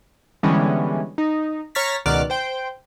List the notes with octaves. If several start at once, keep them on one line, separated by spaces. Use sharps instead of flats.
D3 E3 G3 G#3 B3 C#4
D#4
C#5 A#5 C#6 F6 A6 B6
C#2 B2 D#3 D5 F6 F#6
C5 G5